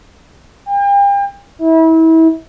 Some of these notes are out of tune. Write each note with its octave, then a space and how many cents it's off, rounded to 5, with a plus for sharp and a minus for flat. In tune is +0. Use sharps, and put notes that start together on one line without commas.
G5 +40
E4 -30